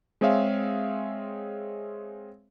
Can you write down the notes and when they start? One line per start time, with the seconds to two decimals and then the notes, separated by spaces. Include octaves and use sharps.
0.21 G#3 C4 G#4 C#5 E5 F5